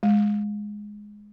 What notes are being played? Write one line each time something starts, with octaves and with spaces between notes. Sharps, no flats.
G#3